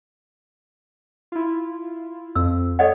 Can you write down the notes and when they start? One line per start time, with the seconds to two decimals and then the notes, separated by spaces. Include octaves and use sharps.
1.32 E4 F4
2.35 F2 E6
2.79 A4 C#5 D#5 F#5